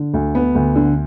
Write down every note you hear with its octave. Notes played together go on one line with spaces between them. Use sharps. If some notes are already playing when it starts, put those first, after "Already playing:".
Already playing: D3
D2
B3
D2
D3